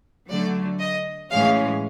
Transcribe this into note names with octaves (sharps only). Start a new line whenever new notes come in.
D3 F#3 A3 D5
D#5
A2 E3 G#3 C#4 F5